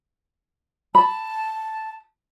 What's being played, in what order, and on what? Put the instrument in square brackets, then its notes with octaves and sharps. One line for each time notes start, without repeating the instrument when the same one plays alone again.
[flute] A5 [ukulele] B5